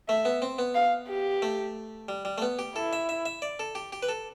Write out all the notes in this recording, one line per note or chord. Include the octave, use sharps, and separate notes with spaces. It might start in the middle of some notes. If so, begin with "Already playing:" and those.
A3 E5
B3
C4
B3
F5
G4
A3
G3
G3
A3
B3
G4
E4 A4
E5
E5
E5
D5
A4
G4
G4
B4
A4